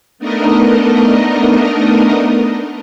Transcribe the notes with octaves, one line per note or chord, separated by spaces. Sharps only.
A3 B3 D4 D#4 A#4 D#5